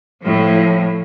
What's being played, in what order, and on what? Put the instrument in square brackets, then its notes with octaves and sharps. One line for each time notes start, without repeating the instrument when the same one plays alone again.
[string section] A2 F3